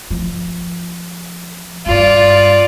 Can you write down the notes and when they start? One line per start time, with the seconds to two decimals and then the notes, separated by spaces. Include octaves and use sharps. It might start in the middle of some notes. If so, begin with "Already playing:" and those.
0.10 F3
1.86 G2 C#4 F4 D5